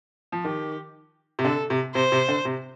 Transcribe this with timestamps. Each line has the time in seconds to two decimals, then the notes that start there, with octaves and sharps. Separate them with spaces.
0.32 F3
0.44 D#3 G4
1.39 C3
1.44 D3 A4
1.70 C3
1.95 C3 C5
2.12 C3
2.28 D3
2.45 C3